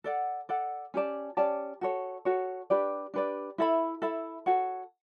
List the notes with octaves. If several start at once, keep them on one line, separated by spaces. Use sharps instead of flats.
A4 D5 F#5
A4 D5 F#5
C#4 G4 D5 A5
C#4 G4 D5 A5
F#4 A4 C#5
F#4 A4 C#5
D4 G4 B4 D5
D4 G4 B4 D5
E4 A4 E5 B5
E4 A4 E5 B5
F#4 A4 C#5 F#5